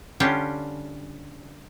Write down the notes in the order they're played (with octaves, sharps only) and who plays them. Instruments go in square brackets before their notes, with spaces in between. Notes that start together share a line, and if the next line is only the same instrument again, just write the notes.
[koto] D3 G3 C#4 D4 F4 G4